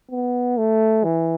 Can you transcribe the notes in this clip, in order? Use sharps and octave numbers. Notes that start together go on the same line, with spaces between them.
B3
A3
E3